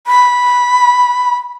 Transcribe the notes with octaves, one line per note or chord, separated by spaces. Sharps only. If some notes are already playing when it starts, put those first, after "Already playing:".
B5